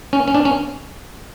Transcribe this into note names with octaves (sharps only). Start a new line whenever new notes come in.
C#4
C#4
D4
C#4